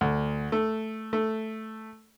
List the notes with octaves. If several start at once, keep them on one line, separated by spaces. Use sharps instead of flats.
D2
A3
A3